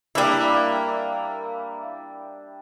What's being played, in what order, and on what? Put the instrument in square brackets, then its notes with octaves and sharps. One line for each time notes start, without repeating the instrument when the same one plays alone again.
[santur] G3 D4 E5 [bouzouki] A#3 E4